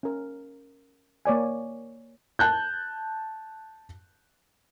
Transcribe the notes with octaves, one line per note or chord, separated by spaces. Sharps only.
C#4 A#4
A#3 C#5 D5 G#5
A5 F#6 G6